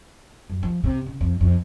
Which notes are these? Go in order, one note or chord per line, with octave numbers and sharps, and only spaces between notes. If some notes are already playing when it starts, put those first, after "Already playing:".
F#2
F3
C3
C#3
F2
F2